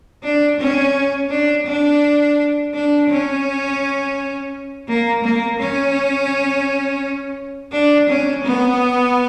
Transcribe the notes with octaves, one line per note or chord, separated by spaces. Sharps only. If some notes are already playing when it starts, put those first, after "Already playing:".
D4
C#4
D4
D4
D4
C#4
A#3
A#3
C#4
D4
C#4
B3